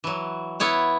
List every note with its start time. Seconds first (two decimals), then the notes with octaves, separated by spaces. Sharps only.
0.04 E3 F#3
0.60 B3 E4 C#5 F#5